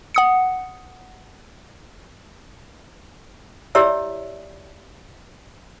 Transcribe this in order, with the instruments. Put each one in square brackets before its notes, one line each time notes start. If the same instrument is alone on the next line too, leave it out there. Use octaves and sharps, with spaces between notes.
[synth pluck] F#5 D#6 C#7
[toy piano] E4 G4 C#5 D5 E5 E6